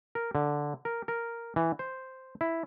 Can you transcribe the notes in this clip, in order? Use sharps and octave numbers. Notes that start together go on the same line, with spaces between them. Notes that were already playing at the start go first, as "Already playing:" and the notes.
A#4
D3
A#4
A#4
E3
C5
E4